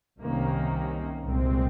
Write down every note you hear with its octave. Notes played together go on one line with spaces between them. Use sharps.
C2 C3 D#3 A#3 C#4
C2 A#2 G#3 C4